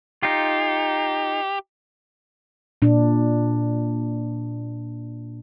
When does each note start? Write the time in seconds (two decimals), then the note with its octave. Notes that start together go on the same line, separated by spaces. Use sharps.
0.23 D#4 F4 G4
2.82 A#2 D4